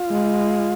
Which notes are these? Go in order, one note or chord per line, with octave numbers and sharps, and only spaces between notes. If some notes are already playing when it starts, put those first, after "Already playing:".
Already playing: F4
G#3